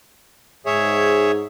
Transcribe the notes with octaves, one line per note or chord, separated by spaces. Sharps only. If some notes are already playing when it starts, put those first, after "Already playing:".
G#2 G#4 C#5 E5